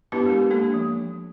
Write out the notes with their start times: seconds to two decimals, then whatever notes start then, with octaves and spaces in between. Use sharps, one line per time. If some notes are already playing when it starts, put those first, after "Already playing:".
0.12 B3 D4 E4 G4 B4 A5
0.26 G#3 D4 G4 A#4
0.51 A#3 D4 A4
0.74 F3